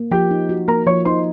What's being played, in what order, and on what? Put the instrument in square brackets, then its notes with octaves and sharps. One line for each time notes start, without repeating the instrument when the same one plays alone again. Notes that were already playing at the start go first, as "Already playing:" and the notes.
Already playing: [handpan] A#3
[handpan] F3 [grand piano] G4 G5
[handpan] D#4
F#4
[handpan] A#3 [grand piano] A#4 A#5
[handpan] F3 [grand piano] C#5 C#6
[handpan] D#4 [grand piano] C5 C6